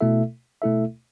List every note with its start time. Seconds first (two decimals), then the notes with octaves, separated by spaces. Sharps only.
0.01 B2 A3 E4 A4 E5
0.62 B2 A3 E4 A4 E5